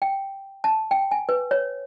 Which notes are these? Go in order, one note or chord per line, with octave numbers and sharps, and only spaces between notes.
G5
A5
G5
G#5
B4
C#5